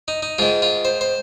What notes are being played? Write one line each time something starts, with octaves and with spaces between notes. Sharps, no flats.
D#4
D#4
G#2 D#3 F4
F4
C5
C5